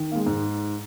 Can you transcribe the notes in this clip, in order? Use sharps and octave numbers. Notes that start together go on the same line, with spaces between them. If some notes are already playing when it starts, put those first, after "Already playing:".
Already playing: D#3
A#3
G#3
G#2